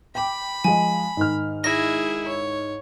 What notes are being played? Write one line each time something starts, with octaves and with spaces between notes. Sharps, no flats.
G5 B5 D6
F3 G#3 G#5
G#2 D#3 F6
E4 G#4 A#6
C#5